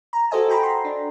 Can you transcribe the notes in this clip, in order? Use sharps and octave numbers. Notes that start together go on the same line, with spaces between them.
A#5
F#4 G4 A4 C5 D#5 G#5
F#4 G5 A#5 B5
C6
D4